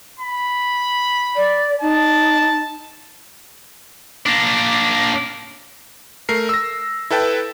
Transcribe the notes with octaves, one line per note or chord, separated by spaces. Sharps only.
B5
D5
D#4 A5
A#3 D4
A3 A#4 C7
E6 A#6
E4 A4 B4 G5 A5